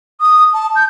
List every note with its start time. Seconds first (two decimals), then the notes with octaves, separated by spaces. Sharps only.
0.21 D#6
0.53 A5
0.76 G6